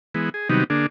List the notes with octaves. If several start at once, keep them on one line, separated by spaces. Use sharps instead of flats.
E3 G#3 B3
G#4
C3 D#3 F#3 G3 B3 D#4
D3 A#3 D4 G#4